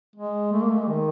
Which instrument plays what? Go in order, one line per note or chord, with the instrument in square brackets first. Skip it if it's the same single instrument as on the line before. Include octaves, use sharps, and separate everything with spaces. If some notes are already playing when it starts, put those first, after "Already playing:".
[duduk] G#3
A3
A#3
A3
G#3
D#3